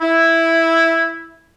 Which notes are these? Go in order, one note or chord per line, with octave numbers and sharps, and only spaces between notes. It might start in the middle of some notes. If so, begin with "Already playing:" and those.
E4